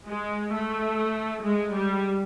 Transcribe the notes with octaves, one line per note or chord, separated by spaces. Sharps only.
G#3
A3
G#3
G3